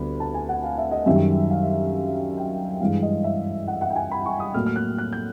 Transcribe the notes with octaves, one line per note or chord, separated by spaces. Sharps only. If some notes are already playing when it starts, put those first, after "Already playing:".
Already playing: D2 D3 G3 B3 B5
A5
G#5
F#5
F5
E5
D#5
F#2 D#3 G3 E5
F5
G5
G2 E3 G#3 F5
D#5
E5
F#5
F#5
G5
G#5
B5
C#6
D#6
A2 F#3 A#3 F6
F6
F#6
F#6
G6